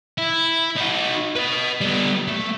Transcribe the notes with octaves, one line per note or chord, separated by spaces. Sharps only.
E4
D#4 F#4
B4 D#5
G3 B3
A3